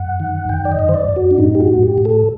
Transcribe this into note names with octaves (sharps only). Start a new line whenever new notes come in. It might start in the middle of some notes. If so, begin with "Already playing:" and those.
Already playing: F#2 F#5
D#3
F#2 G5
D5
D#5
F#2
C5
D5
F#2
F#4
D4
A2 D#4
G4
F#4
A2
G4
A2
A4